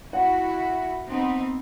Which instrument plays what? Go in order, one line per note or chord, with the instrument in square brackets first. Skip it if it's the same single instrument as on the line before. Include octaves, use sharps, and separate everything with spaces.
[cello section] E4 F#4 [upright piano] F#5
[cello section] B3 C4 D#4